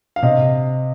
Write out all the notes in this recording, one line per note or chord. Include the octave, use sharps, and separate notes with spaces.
F5
C3 D#5